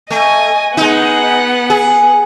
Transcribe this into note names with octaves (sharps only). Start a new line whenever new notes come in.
A3 D#5 G#5
G#3 B3 D#4 F#5
G#4